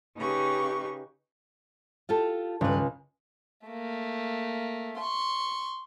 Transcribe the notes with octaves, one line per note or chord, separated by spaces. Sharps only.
C#3 D#4 G4 B4 C#6
F4 G4 A4
C#2 G2 B4
A3 A#3
C6 C#6